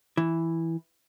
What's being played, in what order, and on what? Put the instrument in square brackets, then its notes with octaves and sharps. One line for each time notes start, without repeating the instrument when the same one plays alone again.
[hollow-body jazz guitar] E3